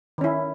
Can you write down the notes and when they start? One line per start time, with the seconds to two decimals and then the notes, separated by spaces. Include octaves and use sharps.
0.18 D#3
0.21 C#4
0.24 E4